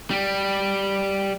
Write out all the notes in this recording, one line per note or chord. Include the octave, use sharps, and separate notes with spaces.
G3